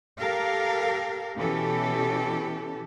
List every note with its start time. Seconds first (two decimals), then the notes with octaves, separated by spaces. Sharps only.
0.19 G4 A4 A#4 F5
1.36 B2 E3 C#4 G4 A4